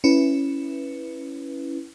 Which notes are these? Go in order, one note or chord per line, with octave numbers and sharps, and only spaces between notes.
C#4 E4 B4